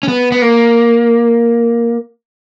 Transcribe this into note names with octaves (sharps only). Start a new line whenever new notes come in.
C#4
B3
B3
A#3